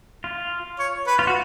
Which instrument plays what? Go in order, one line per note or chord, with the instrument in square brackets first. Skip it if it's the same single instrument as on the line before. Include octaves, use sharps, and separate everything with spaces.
[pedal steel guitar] F4
[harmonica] C#5
B4
[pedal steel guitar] F4
F#4